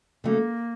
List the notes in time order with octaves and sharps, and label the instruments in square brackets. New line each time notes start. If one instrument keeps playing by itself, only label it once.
[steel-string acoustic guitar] C#3 F#3 A3 [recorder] A#3